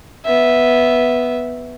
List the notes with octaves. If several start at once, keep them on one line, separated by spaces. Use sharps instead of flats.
B3 E5